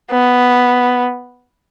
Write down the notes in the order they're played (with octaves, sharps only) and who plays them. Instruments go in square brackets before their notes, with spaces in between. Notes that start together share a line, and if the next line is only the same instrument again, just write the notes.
[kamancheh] B3